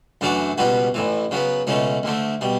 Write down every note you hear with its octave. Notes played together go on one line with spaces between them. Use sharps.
F#2 E3 A3 D4 F#4
C#2 B2 G3 B3 F#4
A1 A2 E3
C#3 F#3 B3
C#2 B2 A3 C#4
D2 D3 A3
B2 G3